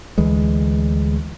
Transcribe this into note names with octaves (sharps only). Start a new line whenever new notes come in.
D2 E3 G#3